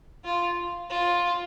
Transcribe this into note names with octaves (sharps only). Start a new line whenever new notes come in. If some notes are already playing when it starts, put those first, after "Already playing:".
F4
F4